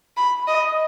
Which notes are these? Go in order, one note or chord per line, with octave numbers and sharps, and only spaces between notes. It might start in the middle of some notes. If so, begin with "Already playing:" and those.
B5
D#5